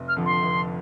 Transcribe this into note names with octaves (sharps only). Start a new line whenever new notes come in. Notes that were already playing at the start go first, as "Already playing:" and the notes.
Already playing: F1
F6
F2 D3 F3
C6
F1